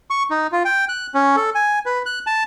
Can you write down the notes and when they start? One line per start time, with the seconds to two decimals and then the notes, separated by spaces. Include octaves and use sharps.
0.10 C#6
0.31 D#4
0.52 F4
0.65 G5
0.89 F#6
1.14 C#4
1.36 A4
1.55 G#5
1.86 B4
2.06 F#6
2.27 A5